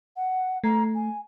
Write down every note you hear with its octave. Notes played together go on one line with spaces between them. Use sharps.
F#5
A3 A#5
G#5